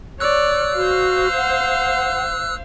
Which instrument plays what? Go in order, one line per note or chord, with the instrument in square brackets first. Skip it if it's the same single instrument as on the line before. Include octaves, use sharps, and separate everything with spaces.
[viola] C#5 D5 [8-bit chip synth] E6 F#6
[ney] F#4 [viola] C5 F5
[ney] F#5